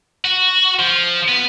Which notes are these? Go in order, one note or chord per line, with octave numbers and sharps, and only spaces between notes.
F#4
F3
B3